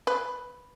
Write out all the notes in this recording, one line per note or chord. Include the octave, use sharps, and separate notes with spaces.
B4